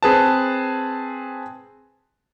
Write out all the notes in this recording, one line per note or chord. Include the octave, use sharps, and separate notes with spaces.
C4 G#4 B4 A5